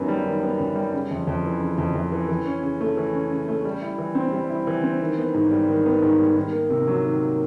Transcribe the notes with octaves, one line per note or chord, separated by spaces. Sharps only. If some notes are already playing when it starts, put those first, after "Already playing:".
Already playing: F#2 D#3 B3
G3
D#3
B3
F#2
G3
C#3
F2
F2
E3
C#3
F2
F2
E3
E3
C#4
C#3
A3
E3
C#4
C#3
A3
G3
E4
E3
C4
G3
E4
E3
C4
D#3
B3
G#2
G3
D#3
B3
G#2
G3
D#3
A#3
C3
F#3
D#3
A#3